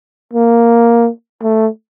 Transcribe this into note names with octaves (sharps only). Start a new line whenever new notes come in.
A#3
A3